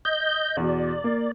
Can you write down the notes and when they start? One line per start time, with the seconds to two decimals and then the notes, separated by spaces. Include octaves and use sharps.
0.05 D#5 G6
0.57 E2 B2 D5
1.04 A#3